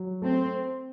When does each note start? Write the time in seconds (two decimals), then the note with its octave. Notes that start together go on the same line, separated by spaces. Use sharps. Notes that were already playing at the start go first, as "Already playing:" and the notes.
Already playing: F#3
0.22 A3 C4